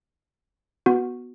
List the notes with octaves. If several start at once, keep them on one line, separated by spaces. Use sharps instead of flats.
B3 F#4